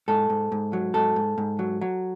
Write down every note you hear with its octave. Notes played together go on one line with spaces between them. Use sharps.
G#2 A4
G#2
G#2
F#3
G#2 A4
G#2
G#2
F#3
F#3